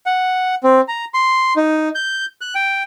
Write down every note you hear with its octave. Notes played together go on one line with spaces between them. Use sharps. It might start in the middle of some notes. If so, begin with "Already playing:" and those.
F#5
C4
A#5
C6
D#4
G6
F#6
G5